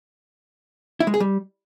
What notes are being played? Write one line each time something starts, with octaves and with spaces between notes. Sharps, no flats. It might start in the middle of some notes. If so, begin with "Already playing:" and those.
E4
G#3
G#4
G3